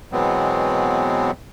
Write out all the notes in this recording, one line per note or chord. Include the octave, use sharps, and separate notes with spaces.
B2 E3 F#3 G#3 B3 C4